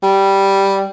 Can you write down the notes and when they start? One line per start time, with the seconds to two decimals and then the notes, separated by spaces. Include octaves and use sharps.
0.03 G3